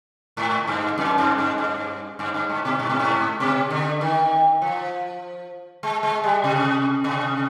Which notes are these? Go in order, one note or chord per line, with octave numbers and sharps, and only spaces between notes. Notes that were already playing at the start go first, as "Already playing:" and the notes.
G#2
G2
F2
G2
G2
G2
G2
G2
G#2
B2
G#2
B2
G#2
B2
D3
D#3
F3
G#3
G#3
G3
C3
C3